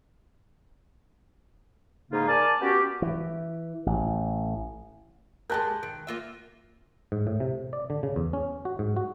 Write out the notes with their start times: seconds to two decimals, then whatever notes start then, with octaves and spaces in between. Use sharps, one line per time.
2.12 G#2 C#3 A#3 D#4 F4
2.28 A#4 D5 G#5 A5
2.61 B3 C#4 F#4 G4
3.02 E3
3.86 A1
5.50 G#3 G4 A#4 A5 F#6 G6
5.83 D#3 D7
6.07 A#3 F4 E5
7.12 G#2
7.27 A2
7.40 C3
7.73 D5
7.90 D3
8.03 C#3
8.16 E2
8.33 C#4
8.65 F#4
8.79 G#2
8.97 F#4